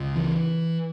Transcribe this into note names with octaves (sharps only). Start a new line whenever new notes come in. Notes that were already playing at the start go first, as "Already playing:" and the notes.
Already playing: C#2 C#3
E3